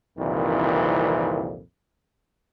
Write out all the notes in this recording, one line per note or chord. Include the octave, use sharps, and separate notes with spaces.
C2 F2 A#2 D#3 E3